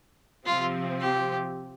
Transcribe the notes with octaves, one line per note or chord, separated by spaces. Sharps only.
C3 F3 C4 F4
G4